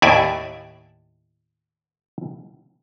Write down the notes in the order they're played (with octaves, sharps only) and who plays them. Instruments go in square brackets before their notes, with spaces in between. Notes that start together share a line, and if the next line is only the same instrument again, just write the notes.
[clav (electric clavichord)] D#2 A2 E4 D5 E5 G#5